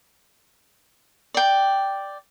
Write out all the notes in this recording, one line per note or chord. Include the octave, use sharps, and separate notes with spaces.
D5 G5